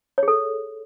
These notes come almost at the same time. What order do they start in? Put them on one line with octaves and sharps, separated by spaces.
C#5 G#4 A4